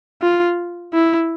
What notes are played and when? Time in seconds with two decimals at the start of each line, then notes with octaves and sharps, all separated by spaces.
0.22 F4
0.94 E4